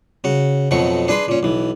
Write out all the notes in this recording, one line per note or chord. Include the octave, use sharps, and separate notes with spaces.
C#3 F#4
F2 B2 F#3 A3 C#6
D4 G#4 B4 B5 C6
A#2 C#4
B1 E3